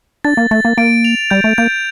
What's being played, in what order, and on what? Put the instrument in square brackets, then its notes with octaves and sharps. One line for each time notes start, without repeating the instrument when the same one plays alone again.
[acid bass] D4 [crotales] A6
[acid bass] A#3
[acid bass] A3 [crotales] A6
[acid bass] A#3
[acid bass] A#3 [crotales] D7
[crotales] F7
[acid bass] G3 [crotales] G6
[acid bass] A3
[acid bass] A#3 [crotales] G6